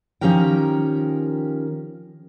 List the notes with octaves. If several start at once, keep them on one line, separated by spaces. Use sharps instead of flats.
D#3 F3 C#4 G4 A#4 G5